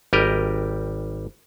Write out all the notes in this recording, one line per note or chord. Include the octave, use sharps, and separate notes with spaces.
G#1 G3 G4 A#4 D#5